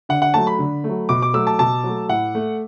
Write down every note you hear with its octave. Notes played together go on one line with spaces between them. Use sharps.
D3 F#5
F#5
F#3 A3 A5
B5
D3
F#3 A3
B2 D6
D6
F#3 A3 E6
A5
B2 A5
F#3
A3
A2 F#5
A3